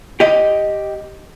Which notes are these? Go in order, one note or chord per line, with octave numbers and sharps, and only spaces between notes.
G4 D#5